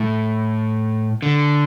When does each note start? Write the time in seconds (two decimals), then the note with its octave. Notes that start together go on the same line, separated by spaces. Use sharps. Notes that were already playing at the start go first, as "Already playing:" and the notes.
Already playing: A2
1.22 D3